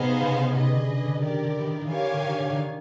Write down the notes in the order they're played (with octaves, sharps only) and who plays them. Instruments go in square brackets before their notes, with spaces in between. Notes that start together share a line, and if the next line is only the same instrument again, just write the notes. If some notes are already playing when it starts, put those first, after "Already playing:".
Already playing: [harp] C3 [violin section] B3 D#4 G#4 C5 F5
[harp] C#3
[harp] C3 [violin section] G#4 B4 D#5
[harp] D3
D3
[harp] D#3 [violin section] G4 A#4 D5
[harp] D3
E3
D#3
D#3
[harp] E3 [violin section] G4 A#4 C#5 F5 G#5
[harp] D3
D#3
D3
D3
D#3